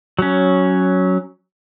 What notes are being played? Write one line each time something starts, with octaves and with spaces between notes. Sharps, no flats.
F#3 C#4